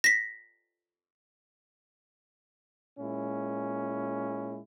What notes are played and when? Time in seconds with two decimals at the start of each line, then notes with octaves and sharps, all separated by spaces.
0.04 A#6 B6
2.99 A#2 G#3 C#4 E4